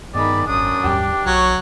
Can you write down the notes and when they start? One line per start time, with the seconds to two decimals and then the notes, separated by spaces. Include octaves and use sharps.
0.14 G2 D#3 G#3 B3 D5 B5
0.47 G#1 F#2 D4 D#6
0.84 D#2 G#2 G3 G4
1.26 B1 F#3 C#5 F#6